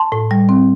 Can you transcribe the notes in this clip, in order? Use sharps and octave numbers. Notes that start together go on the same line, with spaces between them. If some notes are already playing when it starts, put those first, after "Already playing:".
Already playing: A5 C6
A2
G3
C4